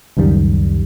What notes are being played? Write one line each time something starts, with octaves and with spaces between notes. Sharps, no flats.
C#2 F#2 D#3 G3